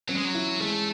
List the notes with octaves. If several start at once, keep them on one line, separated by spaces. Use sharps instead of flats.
F#3 C#4
G#3
F#3
E4
G#3 A3